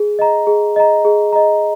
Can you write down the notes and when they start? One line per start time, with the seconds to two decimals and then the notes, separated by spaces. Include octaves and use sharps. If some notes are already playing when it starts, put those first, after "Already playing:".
Already playing: G#4
0.19 D#5 A#5
0.47 G#4
0.76 D#5 A#5
1.05 G#4
1.33 D#5 A#5